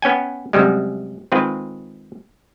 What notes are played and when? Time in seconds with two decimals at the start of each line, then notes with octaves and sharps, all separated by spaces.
0.02 B3 C#4 G5 G#5
0.53 F#2 C3 G3 G#3
1.32 D#3 G#3 C4 F4 B4